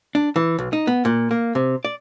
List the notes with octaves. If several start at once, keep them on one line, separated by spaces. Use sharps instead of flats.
D4
E3
B1
D#4
B3
A#2
A#3
C3
D5